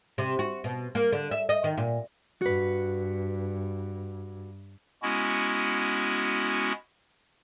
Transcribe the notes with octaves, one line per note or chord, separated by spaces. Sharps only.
C3
F#4
B2
A#3
D3
E5
D#5
D#3
A#2
G2 F#4 B4
G#3 B3 C#4 E4 F#4